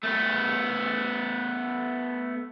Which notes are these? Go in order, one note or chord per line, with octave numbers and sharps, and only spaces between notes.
A3 B3